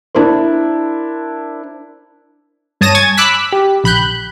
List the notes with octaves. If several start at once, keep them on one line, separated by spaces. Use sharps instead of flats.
D4 E4 A#4 C5
G2 C#5 A5 D#6 A#6 D#7
G#5 C#6 G#6 A6
B5 D6 E6 F#6 B6
G4
A#1 B5 F#6 G6